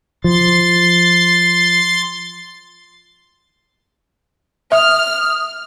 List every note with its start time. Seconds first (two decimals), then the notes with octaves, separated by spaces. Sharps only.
0.24 F3 C6 A6
4.72 E5 D#6 F6